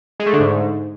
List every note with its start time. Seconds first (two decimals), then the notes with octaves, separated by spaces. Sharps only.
0.20 G#3
0.26 A3
0.33 D3
0.40 G#2